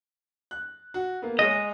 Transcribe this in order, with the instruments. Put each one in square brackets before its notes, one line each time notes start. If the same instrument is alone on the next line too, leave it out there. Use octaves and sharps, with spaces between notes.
[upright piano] F#6
F#4
A#3 B3
[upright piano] G#3 G#4 C#5 [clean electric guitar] D#5